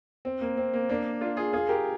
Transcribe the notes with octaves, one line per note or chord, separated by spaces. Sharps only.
C4
A#3
C4
A#3
A#3 D4
D4 F4
F4 G#4
F4 G#4
G4 A#4